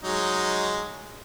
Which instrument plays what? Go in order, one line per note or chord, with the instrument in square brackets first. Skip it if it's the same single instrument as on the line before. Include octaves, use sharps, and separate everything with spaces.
[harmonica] F#3 G#3 D#4